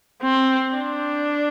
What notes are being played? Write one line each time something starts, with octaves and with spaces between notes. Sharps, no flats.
C4
D4